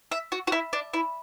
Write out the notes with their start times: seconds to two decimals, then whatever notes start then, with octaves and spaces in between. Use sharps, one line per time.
0.11 E5
0.32 F#4
0.47 F#4
0.52 E4
0.73 D4
0.94 E4